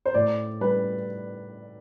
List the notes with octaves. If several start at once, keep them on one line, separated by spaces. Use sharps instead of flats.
C5
A2 D5
G3 B4